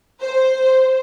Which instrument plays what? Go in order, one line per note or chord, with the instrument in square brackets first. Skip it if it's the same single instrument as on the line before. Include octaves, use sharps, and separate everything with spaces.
[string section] C5